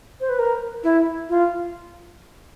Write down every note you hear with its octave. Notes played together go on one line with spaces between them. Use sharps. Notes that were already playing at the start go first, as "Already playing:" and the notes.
C5
B4
A#4
E4
F4